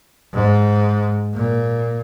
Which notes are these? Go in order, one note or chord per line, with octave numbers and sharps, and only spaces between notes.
G#2
A#2